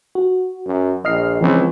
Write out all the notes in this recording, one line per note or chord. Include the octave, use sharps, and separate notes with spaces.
F#4
F#2
A#1 D#5 F6 C7
C#2 E3 F3 C4